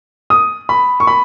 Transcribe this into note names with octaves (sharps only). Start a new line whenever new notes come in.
D#6
B5
C#6
B5